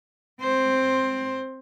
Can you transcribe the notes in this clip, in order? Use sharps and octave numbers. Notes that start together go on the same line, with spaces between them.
C4 C5